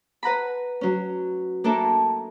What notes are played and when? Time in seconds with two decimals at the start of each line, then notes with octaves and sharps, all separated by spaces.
0.23 B4 F#5 A#5 B5
0.81 F#3 C#4
1.64 A#3 D4 E4 A4 A#4